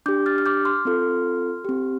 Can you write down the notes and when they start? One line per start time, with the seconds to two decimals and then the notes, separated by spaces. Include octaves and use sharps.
0.06 D4 G4 D6 G6
0.26 F6 A6
0.38 F6
0.46 D6 G6
0.65 C6 F6
0.85 C4 F4 A4
1.65 C4 G4